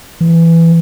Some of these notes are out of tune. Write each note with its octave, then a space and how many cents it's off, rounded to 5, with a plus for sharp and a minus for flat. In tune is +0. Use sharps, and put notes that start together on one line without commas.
E3 +10